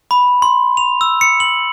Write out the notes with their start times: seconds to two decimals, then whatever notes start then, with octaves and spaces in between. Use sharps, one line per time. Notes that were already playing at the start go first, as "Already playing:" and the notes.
0.11 B5
0.42 C6
0.77 F7
1.01 E6
1.21 C#7
1.40 F#7